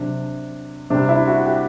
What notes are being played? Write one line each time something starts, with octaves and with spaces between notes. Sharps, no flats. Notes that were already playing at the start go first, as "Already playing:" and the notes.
Already playing: C3 F#3 D4
C3 G3 D4
E4
F#4
G4